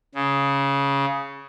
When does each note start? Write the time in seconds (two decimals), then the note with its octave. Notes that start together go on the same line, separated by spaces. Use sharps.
0.15 C#3